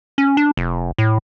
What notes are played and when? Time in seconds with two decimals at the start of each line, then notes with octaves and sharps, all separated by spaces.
0.18 C#4
0.37 D4
0.57 F1
0.98 A2